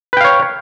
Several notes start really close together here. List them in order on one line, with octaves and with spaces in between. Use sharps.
B4 G5 F5 C#5